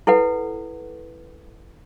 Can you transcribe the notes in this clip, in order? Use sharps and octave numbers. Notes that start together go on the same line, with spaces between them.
E4 A4 B4 F#5